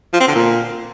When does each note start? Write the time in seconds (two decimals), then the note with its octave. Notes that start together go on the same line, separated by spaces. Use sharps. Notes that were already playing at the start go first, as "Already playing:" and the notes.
0.13 F3
0.20 C4
0.28 D3
0.35 A#2